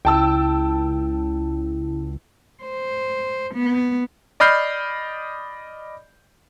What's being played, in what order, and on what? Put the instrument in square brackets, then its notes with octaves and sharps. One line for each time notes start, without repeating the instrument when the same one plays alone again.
[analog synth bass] C#2 [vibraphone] E4 [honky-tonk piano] G5 A5 E6
[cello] C5
B3
[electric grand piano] D5 D#5 B5 F6 G6 C7